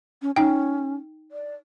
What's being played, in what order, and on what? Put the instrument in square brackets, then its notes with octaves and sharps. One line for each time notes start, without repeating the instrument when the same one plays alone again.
[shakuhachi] C#4
[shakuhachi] C#4 [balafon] D#4 G5
[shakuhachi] D5